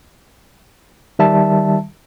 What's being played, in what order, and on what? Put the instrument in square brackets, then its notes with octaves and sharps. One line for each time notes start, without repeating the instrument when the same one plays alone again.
[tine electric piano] D#3 G3 E5 A5